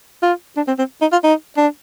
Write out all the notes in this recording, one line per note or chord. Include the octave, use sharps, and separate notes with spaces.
F4
D4
C4
C4
D#4
F4
D#4
D4